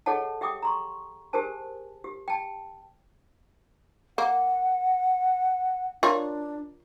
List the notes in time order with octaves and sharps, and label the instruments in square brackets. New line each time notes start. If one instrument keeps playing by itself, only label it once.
[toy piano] G#4 A4 C#5 D#5 F#5 A5
G4 E5 G5 D6 D#6
A#5 C6 C#6
G4 G#4 A#4 C5 G#5 A5
G4
G5 A5
[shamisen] A#3 [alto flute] F#5
[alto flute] D4 [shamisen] F4 A#4 C#5